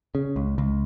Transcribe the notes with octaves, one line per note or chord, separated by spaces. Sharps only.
C#3
C#2
C#2